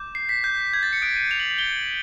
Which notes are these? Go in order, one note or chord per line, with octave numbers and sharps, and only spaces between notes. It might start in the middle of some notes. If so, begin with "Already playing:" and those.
Already playing: D6 G6
C7
B6
G6
G#6
A6
C#7
D#6 F#6 D7
D#7
F7
F#7
F#7
G7